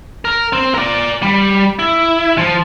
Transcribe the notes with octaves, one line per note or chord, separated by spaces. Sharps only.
A#4
C4
A#4 D5
G3
E4
F3